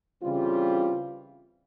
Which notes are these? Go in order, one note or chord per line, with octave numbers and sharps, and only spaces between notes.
C#3 E3 G3 C4 F4